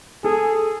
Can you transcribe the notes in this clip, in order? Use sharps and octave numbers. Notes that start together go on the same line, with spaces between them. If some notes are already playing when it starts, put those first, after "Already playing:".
G#4 A4